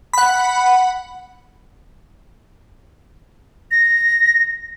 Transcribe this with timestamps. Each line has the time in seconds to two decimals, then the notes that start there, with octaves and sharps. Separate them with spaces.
0.13 F#5 B5
3.71 A#6